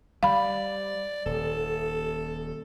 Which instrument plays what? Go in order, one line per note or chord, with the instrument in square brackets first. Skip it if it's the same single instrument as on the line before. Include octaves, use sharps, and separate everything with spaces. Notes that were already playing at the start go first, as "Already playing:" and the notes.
[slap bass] G3 [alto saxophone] D5 [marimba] F5 B5
[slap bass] D#1 [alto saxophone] A4